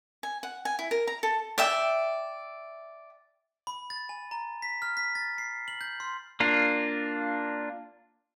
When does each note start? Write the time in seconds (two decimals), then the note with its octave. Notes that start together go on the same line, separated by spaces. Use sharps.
0.23 G#5
0.43 F#5
0.65 G#5
0.79 E4
0.91 A#4
1.07 A#5
1.23 A4
1.58 D5 E5 G5
3.67 B5
3.90 A6
4.09 G#5
4.31 A#5
4.62 B6
4.82 F6
4.97 B6
5.15 A6
5.38 C7
5.68 F#7
5.81 G6
6.00 C6
6.40 A#3 D4 F4